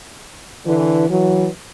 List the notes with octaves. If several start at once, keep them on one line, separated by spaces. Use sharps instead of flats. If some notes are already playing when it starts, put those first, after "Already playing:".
D3 E3
E3 F#3